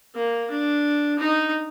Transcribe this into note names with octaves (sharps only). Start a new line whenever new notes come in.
A#3
D4
D#4